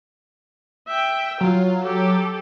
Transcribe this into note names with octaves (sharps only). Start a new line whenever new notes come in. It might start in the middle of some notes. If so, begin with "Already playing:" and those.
E5 G5
F#3 F4
G4 A4